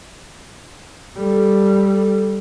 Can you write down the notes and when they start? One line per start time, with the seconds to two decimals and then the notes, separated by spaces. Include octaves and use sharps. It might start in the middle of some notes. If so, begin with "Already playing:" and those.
1.17 G3 A4